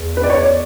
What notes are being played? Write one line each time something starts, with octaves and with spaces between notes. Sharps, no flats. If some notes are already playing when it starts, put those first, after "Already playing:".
Already playing: E2
B4
D5
C#5
D5